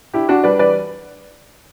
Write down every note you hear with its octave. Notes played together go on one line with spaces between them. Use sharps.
D4 E4 G4
D4 F#4
G3 B4 D5
E3 B4 D5